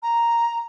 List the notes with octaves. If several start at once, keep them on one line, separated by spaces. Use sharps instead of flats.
A#5